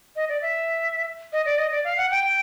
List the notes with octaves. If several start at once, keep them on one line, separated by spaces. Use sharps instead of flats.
D#5
D5
E5
D#5
D5
D#5
D5
F5
F#5
G5